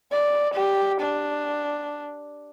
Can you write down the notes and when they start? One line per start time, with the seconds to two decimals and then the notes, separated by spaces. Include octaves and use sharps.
0.12 D5
0.54 G4
1.01 D4